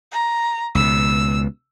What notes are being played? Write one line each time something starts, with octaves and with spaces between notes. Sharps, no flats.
A#5
C#2 B2 E6